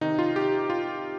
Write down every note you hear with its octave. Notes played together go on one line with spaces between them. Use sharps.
C3 D#3 D#4
F4
G4
F4